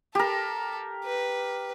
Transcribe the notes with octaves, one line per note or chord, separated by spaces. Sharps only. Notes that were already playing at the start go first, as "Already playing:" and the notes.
G4 A4 A#4
B4